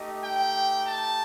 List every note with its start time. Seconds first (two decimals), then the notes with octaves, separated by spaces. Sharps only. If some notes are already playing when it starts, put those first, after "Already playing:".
Already playing: A3 D#4 G4 D#5
0.22 G5
0.87 A5